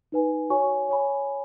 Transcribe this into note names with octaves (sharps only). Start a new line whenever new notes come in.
D#4 B4 G#5
F#4 C#5 G#5 C#6
C#5 G#5 B5